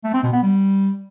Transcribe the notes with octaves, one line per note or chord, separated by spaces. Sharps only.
A3
C4
B2
B3
G3